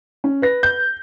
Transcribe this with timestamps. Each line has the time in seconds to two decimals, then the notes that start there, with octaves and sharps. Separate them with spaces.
0.24 C#4
0.42 B4 A#6
0.63 G6